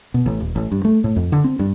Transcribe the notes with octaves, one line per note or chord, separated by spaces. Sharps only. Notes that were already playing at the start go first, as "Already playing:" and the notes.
B2
A1
D#1
A1
G2
A3
A2
F2
D3
C4
G2